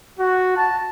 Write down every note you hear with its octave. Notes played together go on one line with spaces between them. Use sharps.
F#4
A5